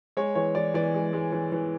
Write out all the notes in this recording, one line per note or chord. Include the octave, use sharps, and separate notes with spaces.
G#3 C#5
E3 C#5
E3 D5
E3 D5
G#3
G#3
E3
E3